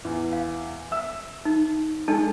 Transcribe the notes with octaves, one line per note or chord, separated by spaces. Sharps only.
E2
F5
E5 E6
D#4
G#3 D4 D#4 A4 A5